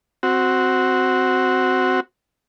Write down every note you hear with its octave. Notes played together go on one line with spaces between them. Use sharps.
C4 F#4